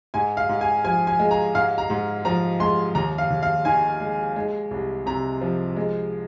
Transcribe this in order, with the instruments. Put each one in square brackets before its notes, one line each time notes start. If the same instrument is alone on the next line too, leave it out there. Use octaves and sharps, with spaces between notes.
[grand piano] G#2 G#5
F5
G#2
G#5
F3 G#5
G#5
G#3
A#5
G#2 F5
A#5
G#2
F3 A#5
G#3 C6
D#2 A#5
F5
D#2
F5
D#3 G#5
G#3
G#3
C2
C3 A#5
F3
G#3